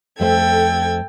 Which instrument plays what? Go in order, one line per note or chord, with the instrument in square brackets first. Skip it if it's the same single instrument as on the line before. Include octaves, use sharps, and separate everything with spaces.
[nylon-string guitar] F2 A3 C5 [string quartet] A4 G5 G#6